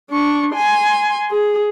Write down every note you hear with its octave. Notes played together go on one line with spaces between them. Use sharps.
D4 C#6
G#5 C6
G#4